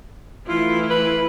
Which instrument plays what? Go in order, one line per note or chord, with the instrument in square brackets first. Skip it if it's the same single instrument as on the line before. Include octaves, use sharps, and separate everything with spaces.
[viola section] E3 A3 E4 [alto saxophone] F4
[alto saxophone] B4